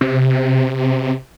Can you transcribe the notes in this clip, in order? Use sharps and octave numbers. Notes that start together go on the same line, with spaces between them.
C3